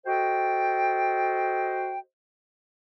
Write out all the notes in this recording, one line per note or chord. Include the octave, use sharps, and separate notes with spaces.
F#4 A4 C5 D#5 G5